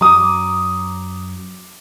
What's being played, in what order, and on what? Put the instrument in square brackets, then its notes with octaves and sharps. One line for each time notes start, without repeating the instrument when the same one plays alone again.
[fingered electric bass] F#2 F#3 [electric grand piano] A#5 D#6 [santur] D6